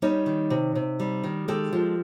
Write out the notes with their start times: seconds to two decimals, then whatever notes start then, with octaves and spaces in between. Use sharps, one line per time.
0.02 G3 C#4 D#4
0.26 D#3
0.50 C3
0.75 C3
1.00 G3
1.23 D#3
1.48 G#3 G4 A4
1.73 F3